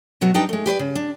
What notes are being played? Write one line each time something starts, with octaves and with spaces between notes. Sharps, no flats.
B2 F#3 B3 F#4
G3 D4 D#4 B4 G5
G#3 A3
G4 B4 C5 D5
C#3
D4